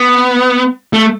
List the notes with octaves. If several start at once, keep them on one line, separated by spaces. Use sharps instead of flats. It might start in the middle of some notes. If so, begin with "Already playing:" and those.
Already playing: B3
A3